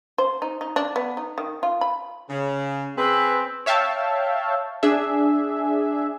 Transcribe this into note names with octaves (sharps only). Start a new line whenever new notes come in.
C5
D#4
D#4
D4
B3
D#4
D#3
F4
B5
C#3
C4 G#4 B4
C#5 E5 F5 G5 A5
D4 G#4 E5